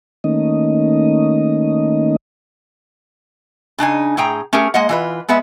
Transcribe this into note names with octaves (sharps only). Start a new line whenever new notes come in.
D#3 A3 A#3 C#4 D#4 D#5
C#3 D4 D#4 G#5
A2 G#4 G5 A#5
A3 C#4 G4 G#4 A#4
G#3 A#3 D#5 F#5
E3 F4 B4
G#3 B3 B4 E5